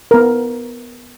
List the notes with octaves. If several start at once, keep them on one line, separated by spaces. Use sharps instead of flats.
B3 A#4